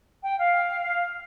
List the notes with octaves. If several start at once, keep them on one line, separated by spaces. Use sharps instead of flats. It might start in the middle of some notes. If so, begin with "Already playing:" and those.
G5
F5